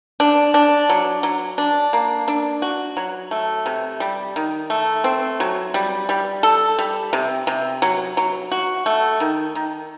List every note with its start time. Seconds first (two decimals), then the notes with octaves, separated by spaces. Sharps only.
0.20 D4
0.54 D4
0.89 F#3
1.23 F#3
1.58 D4
1.93 A#3
2.28 D4
2.62 F#4
2.97 F#3
3.31 A3
3.66 C3
4.00 G3
4.36 D#3
4.70 A3
5.04 C4
5.40 F#3
5.74 G3
6.09 G3
6.43 A4
6.79 G3
7.13 C3
7.47 C3
7.82 F#3
8.17 F#3
8.52 F#4
8.86 A3
9.20 D#3
9.55 D#3